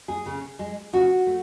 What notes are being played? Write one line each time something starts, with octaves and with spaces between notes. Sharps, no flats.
G#4
C#3
G#3
C#3 F#4
A3